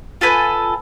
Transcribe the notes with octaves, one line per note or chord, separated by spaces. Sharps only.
F4 A4 B4 G#5